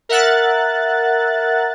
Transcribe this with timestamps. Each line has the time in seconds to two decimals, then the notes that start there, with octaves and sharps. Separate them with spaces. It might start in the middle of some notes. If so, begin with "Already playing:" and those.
0.09 A#4 E5 F#5 F#6 A6